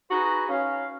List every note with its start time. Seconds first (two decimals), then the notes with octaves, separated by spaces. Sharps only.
0.11 D#4 F#4 G#4 B4
0.49 C#4 F5